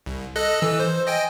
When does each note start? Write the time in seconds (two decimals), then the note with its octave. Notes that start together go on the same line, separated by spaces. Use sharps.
0.06 C2
0.36 A4 D#5 F#6
0.61 E3 E6
0.80 C5
1.07 D#5 G5 G#5